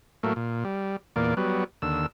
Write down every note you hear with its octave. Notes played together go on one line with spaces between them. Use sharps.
A2 F#3 A3 A#3
A#2
G3
E2 A#2 A#3 D5
F#3 G3 B3
D#2 D3 E6